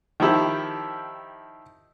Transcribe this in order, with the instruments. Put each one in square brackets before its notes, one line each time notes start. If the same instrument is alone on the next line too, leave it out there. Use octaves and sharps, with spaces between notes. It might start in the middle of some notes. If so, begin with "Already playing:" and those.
[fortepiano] D#3 F3 E4 G4